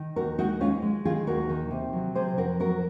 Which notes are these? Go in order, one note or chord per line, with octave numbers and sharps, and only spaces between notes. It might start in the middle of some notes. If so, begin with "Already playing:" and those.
Already playing: D#3
D#2 F#4 A#4
G#3 D#4 F#4
G#3 C#4 F4
G#3
D#3 F4 G#4
D#2 F#4 A#4
D#3
C3
F#3
C3 G#4 C5
F2 F#4 A#4
F#3 F#4 A#4